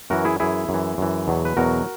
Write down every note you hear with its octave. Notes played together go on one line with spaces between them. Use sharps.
F#2 E3 F#4 A#4
E4 G#4
F#2 E3 E4 G#4
F#2
E3
F#2 E3
E2 B2 F#3
B4
E2 B2 F#3 F#4 A#4